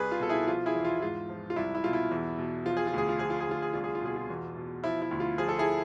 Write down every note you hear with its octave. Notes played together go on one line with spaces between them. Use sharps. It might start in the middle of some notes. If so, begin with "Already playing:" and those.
Already playing: C2 G#4 B4
F4
B2 A4
E4 G#4
F3 F4
E4 G#4
E2
F4
G#2 F4
F3
F4
C2 E4
E4
B2 F4
E4
E2
B2
F3 F4
G#4
F4
D2 G#4
F4
F3 G#4
F4
G#4
D2 F4
G#4
C2 F4
G#4
F4
B2 G#4
F4
E2
B2
F3 E4
E4
D2
F4
F3 G#4
A4
E4 G#4